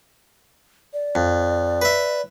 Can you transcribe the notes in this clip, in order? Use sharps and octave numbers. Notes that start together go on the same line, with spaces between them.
D5
F2
B4 E5